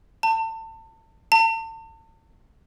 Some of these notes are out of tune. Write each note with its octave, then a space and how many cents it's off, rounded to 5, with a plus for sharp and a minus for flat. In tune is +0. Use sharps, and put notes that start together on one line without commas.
A5 +30
A5 +40